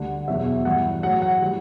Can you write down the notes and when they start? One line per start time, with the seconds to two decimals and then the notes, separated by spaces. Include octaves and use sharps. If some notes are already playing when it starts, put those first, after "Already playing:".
Already playing: D2 D3 G3 F#5
0.28 E2 B2 F#3 E5
0.65 G2 E3 G3 F#5
1.03 A2 F#3 F#5
1.22 F#5
1.41 E3 G3